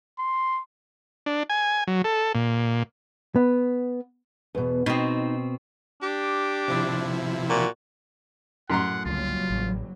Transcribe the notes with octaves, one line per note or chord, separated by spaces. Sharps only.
C6
D4
G#5
F#3
A4
A#2
B3
E2 B2
B2 C4 D#4
D4 G4
C3 F3 E4
A#2 F#4
F#2 A2 F#5 A#5 C6
F#1 C#2 D3 F#3 G3 F4
A1